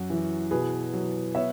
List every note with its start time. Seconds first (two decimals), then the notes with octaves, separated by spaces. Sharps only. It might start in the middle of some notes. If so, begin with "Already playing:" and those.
Already playing: F#2 F#4
0.10 E3
0.51 B2 G#4 B4
0.94 F#3
1.35 B3 C#5 E5